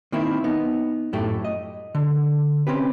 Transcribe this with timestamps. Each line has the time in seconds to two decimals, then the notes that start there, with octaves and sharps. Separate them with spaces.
0.12 D#3 A#3 C4 E4
0.44 B3 D#4
1.13 F#2 A2 A3 G4
1.44 D#5
1.95 D3
2.67 C4 C#4 G4 B4